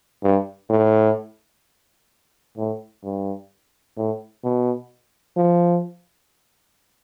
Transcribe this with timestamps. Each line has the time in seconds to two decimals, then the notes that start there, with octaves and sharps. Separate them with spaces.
0.23 G2
0.69 A2
2.58 A2
3.04 G2
3.97 A2
4.44 B2
5.37 F3